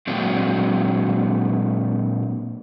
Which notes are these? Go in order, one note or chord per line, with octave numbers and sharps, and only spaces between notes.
A#2 F#3 G#3 C4 D4